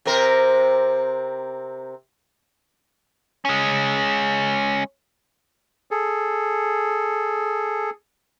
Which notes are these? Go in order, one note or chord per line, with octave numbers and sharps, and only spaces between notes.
C3 C4 A#4
G#3 C#4
G#4 A4